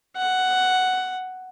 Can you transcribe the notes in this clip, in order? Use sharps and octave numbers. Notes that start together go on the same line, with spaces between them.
F#5